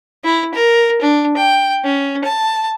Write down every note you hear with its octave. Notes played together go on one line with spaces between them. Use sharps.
E4
A#4
D4
G5
C#4
A5